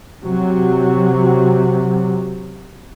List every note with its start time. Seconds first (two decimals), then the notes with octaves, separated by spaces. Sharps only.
0.23 C3 F#3